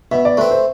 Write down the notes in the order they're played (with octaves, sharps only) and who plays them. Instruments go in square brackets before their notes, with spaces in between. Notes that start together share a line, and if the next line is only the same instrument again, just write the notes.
[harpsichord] B2 [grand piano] E5
[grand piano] D5
[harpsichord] A3 C4 [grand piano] B4
[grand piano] C5